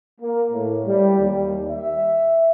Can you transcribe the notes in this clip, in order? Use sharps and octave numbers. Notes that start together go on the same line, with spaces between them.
A#3
A2
G3
D#2
E5